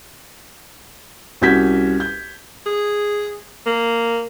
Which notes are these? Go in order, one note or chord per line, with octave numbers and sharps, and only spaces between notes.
C2 C#4 F#4 G6 G#6 B6
G6
G#4
A#3